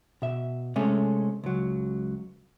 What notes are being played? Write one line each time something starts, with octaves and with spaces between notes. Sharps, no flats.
B2 E5
C3 G#3 A3 C#4
C#2 F#3